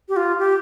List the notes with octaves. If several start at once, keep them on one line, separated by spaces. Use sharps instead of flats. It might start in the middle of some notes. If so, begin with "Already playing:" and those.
G4
F4
G4